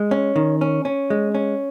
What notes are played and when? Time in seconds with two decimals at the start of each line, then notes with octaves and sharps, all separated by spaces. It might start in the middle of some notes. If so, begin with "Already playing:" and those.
Already playing: G#3
0.11 C#4
0.36 D#3
0.61 C#4
0.85 C#4
1.10 G#3
1.35 C#4